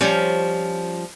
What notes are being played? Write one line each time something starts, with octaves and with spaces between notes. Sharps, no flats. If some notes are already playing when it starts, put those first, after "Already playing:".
F3 G3 C#4